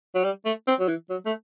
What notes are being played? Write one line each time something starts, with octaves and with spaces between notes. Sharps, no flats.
F#3
G3
A3
C4
F#3
E3
F#3
A3